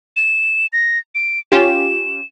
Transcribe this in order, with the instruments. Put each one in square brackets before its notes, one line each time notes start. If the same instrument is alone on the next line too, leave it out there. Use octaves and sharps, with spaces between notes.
[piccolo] E7
A#6
D7
[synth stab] C#4 F4 G4 [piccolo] E7